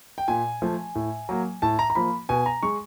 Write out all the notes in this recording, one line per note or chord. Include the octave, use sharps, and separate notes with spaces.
G5
A#2 G#5
F3 A3
A2
F#3 A#3
A2 A5
A#5
A#5
F3 A#3 B5
B2 G#5
A#5
G#3 C#6